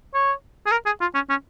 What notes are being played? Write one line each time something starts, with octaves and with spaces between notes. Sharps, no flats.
C#5
G#4
A#4
G#4
F4
C#4
C#4